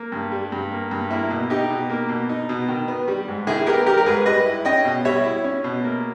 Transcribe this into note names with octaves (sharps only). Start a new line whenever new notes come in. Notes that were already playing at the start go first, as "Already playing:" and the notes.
Already playing: A#3
G2
G3
G2
A#3
G2
A#3 E4
B2
D#4 G4
B2
A#3
B2
D#4
B2
D#3
B3
G3
G#2
D#3 E4 G#4
B3 G4 A#4
G3 G4 A#4
A#4
G#2 G#4 B4
G3 B4 D#5
E4
C#4 D#5 G5
B2
G3 C#5 E5
E4
C#4
B2
A#3